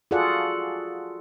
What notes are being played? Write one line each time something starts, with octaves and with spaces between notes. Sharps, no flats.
F4 F#4 G#4 A4 D5 F#5